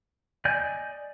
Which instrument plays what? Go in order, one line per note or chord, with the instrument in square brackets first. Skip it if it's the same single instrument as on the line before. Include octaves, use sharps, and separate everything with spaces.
[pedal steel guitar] D5 D#5 G#5 G6